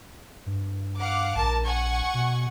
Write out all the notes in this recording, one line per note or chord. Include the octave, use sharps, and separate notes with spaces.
G2
F5 F#5 D6
A#1 A#4 A5
F#5 G#5 C#6
B2